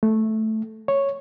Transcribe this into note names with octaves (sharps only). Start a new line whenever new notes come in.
A3
C#5